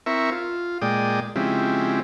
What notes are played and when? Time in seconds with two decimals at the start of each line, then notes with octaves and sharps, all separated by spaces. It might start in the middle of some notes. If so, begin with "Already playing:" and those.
0.06 C4 E4 A#4 E5 C#6
0.32 F4
0.82 A#2 G#3 D5 G5 D#6
1.36 C#3 F3 G#3 C4 E4 G4